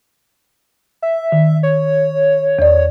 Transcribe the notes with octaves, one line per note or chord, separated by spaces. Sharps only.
E5
D#3
C#5
E2 D5